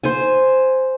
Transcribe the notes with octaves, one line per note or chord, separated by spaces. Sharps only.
C5 G#5